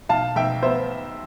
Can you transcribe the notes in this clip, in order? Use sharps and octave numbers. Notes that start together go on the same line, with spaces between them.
B1 F5 A5
B1 E5 G5
B3 C5 E5